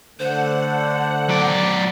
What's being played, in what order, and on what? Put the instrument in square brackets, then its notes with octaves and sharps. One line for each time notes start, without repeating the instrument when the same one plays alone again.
[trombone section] D3 A3 [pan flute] C5 [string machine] F#5
[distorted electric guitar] F#3 D5